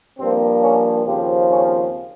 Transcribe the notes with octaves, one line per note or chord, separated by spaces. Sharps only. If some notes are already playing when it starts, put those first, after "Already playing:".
G2 F3 A#3 C4
C#4
D#2 C#3 F3 C4 G4
C#4